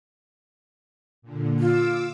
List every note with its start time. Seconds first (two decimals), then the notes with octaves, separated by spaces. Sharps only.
1.22 A#2 D3
1.60 F4 D6 E6